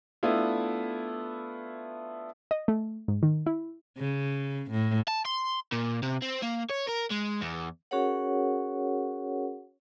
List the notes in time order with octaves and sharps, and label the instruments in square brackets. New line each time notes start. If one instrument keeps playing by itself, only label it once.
[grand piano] A3 B3 D4 E4 F4
[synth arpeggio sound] D#5
A3
G#2
D#3
E4
[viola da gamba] C#3
A2
[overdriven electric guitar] A5
C6
A#2
C3
C4
A#3
C#5
A#4
G#3
E2
[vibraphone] C#4 F#4 G#4 A#4 C#5 F#5